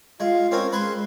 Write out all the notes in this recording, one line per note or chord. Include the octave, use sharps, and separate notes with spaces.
G#3 F4 F5
C4 C#4 A#4 G#5
G#3 B4 G#5 C6